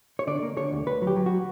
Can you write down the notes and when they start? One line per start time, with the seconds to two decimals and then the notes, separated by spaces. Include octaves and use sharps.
0.19 C#5
0.27 D3 D5
0.42 A#3
0.57 D3 C#5
0.72 D2
0.86 D2 B4
1.02 F#3
1.07 G4
1.16 F#3
1.26 F#4